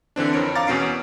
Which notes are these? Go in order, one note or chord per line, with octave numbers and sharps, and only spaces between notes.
D3 E3 C4 D4
F2 A#4 C#5 D7
F5 A#5 D6 F6 A6
E2 B2 C#4 C7 D7